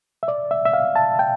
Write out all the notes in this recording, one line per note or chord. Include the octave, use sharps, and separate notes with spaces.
E5
D5
E5
E5
F5
A5
G5